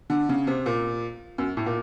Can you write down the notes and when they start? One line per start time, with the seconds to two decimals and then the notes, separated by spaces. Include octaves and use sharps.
0.10 D3
0.29 C#3
0.47 C3
0.66 A#2
1.38 F#2
1.57 A2
1.66 A#2